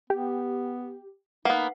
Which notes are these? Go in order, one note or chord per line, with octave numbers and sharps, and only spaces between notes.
B3 G4
A#3 B3 D#4 B4 F5 F#5